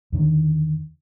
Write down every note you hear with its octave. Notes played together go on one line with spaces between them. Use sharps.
E2 D3 D#3